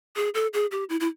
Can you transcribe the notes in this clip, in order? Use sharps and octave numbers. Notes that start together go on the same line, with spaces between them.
G#4
A4
G#4
G4
E4
E4